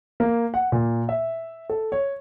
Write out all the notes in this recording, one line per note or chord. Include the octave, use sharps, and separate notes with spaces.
A#3
F#5
A#2
E5
A4
C#5